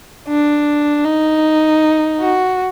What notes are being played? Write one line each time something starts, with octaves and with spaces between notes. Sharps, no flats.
D4
D#4
F#4